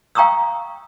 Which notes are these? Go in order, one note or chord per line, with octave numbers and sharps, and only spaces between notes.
F5 G5 A#5 C#6 D#6 E6